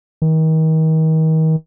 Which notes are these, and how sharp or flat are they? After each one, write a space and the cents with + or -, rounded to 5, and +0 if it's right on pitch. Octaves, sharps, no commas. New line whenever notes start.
D#3 +35